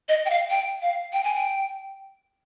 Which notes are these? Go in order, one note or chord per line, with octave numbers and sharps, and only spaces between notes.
D#5
G5
F5
G5
F5
G5
G#5
G5